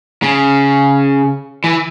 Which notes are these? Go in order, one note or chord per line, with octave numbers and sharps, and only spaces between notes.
C#3
E3